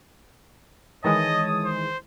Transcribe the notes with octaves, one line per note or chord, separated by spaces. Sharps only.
D#3 E3 G#3 C#5 D#5 A5 D#6
C5